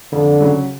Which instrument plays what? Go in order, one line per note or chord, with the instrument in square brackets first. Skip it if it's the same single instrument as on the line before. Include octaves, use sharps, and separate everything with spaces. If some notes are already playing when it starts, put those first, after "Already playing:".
[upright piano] F2 [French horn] D3
[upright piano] C#3 F#3